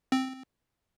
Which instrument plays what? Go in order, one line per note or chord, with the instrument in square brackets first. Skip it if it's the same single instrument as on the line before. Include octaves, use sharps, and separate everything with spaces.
[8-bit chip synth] C4